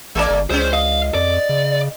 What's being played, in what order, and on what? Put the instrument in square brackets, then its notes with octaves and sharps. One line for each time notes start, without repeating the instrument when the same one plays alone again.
[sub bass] A1 [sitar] G#3 A#3 D5
[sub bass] G1
[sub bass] C#2 [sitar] G#3 C4 C#4 [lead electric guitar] C5
[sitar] D#5 [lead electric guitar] F5
[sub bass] F2 [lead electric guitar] D5
[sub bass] C#3